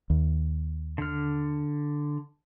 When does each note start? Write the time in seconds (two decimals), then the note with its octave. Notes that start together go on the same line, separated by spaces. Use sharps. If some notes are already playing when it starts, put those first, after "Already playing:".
0.10 D#2
0.98 D3 F6